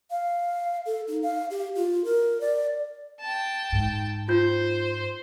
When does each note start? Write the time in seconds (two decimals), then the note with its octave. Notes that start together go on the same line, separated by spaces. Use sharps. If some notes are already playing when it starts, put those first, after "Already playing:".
0.11 F5
0.86 A4
1.07 D#4
1.23 F5
1.50 G4
1.75 F4
2.05 A#4
2.41 D5
3.21 G5 A5
3.72 G#2
4.28 F4 C5 G6